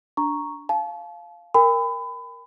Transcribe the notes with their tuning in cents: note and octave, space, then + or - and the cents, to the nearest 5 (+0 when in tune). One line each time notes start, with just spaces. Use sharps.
D4 +0 A#5 +0 C#6 +0
F5 +0 A5 -35
A#4 +0 G5 +45 B5 +30